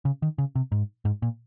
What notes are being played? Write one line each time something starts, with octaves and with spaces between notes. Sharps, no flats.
C#3
D#3
C#3
C3
G#2
G#2
A#2